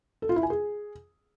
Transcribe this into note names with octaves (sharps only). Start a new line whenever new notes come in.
A4
F4
E4
G#5
G#4